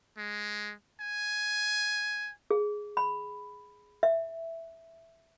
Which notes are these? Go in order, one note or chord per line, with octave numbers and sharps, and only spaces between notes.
G#3
G#5
G#4
B5
E5